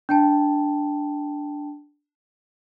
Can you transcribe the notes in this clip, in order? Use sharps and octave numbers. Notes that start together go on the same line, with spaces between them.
D4 G5 A5